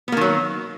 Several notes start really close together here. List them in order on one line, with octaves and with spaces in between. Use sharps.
B3 A#3 D#3 F#3